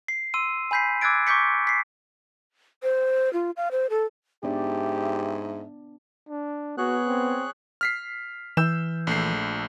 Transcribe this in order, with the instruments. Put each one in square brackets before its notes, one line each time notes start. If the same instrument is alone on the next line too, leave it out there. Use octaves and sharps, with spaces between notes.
[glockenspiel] C7
C6 E6 D#7
G#5 B5 G6 B6 C7
D6 E6 F#6 G#6 A6 D7
C#6 D6 G6 B6 C#7
B6 C7
[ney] C5
F4
F5
C5
A4
[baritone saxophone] G#2 [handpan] B3 D4 D5 [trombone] G4 [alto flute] E5
[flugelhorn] D4
[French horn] B3 [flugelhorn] F#4 [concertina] G#4 C#5 F#6
[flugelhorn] C4
[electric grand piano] F6 B6 C7
[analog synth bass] E3 [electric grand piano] E6 G6 E7
[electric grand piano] A#1 A3 C7